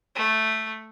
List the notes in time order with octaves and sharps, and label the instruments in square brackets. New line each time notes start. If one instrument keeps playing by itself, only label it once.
[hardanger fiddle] A3